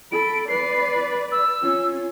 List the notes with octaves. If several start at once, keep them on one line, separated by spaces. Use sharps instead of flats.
A4 B5 D7
B4 D5 C7
E6
C#4 F4